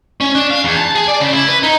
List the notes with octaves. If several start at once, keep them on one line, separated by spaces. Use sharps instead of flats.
C#4
D4
F5
E2
A5
G#4
D5
C#3
E4
B4
D#4